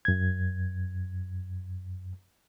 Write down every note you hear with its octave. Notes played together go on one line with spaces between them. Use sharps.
F#2 G#6